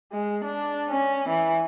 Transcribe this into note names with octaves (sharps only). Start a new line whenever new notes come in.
G#3
D4
C#4
E3